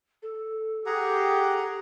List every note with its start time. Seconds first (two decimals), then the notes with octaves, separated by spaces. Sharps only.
0.22 A4
0.86 G4 G#4 F#5 A#5